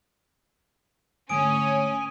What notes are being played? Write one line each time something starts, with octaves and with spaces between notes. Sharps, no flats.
G#2 D3 A3 C#4 C#5 G#5 D#6 D7